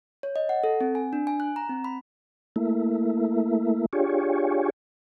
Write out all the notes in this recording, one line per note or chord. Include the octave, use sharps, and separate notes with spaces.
C#5
D#5
F#5
A4
C4
G#5
D4
G#5
F#6
A#5
C4
B5
A3 A#3 E4
D4 F4 G4 G#4 C#5